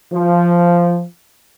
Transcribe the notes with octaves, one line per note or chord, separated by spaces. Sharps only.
F3